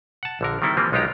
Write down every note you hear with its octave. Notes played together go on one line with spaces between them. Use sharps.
F#5 A5
A#1 D3 A#4
D#3 G3 C4 E4 A4
E3 F3 G3 A#3 C4
B1 G#3 D#4 F4 G4 A#5